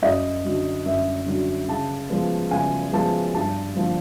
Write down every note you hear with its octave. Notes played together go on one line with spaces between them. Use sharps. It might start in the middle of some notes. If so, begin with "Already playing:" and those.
F#2 D#5
D3 F#3
F#2 E5
D3 F#3
C#3 A5
F3 G#3 B3
C#3 G#5
F3 G#3 B3 A5
G2 A5
D3 F3 A#3